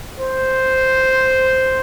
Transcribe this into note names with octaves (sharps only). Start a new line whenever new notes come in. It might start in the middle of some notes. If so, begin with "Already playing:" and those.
C5